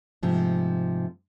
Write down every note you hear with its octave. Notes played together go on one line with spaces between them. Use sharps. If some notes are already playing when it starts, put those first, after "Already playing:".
G#2 C3 F3 A3